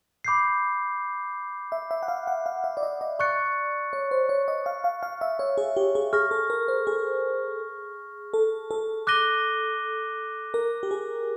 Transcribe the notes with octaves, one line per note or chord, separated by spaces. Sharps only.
B5 D6 G6 C7
E5
E5
F#5
F5
F#5
F5
E5
D5
D#5
D#5
D5 C#6 F#6 A6 C#7
C#5
C5
C#5
D#5
F5
F5
F5
E5
C#5
G#4
G4
G#4
G#4 C#6 F6 A#6
A4
A#4
C5
G#4
A4
A4
D6 F#6 A#6 D#7 G7
A#4
G4
G#4